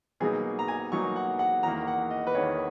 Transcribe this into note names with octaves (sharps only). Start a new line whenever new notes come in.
B2 F#3 A#3 D#4 G#4
A#5
G#5
B2 F#3 A#3 D#4 C#6
F#5
F#5
E2 D#3 A#3 A#5
F#5
D#5
B4
E2 D#3 A#3 C#5